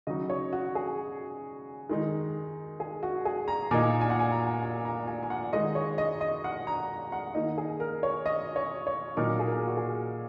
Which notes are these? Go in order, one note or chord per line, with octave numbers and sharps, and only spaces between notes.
C#3 F#3 D#4 D#5
C#5
F#4
G#4
D#3 G#3 D#4
G#4
F#4
G#4
A#5
A#2 A#3 D#4 G#5
G#5
F#5
G#5
A#5
G#5
A#5
G#5
G#5
F#5
D#3 G#3 D#4 D#5
C#5
D#5
D#5
F#5
A#5
F#5
D#3 A#3 D#4 D#5
G#4
A#4
C#5
D#5
C#5
C#5
A#2 F#3 D#4 A#4
G#4
A#4
F#4
G#4